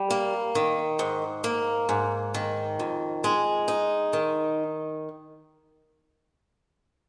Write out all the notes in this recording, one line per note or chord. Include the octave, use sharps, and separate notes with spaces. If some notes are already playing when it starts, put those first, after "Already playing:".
Already playing: G3
A#3
D#3
G#2
A#3
G#2
D#3
F2
G#3
D#4
D#3